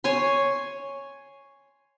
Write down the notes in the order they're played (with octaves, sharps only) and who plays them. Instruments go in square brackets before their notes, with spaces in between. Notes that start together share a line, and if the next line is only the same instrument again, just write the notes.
[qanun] C#5 G#5 C6